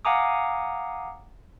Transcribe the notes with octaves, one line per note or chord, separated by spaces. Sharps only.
F5 F#5 G#5 A#5 D6 D#6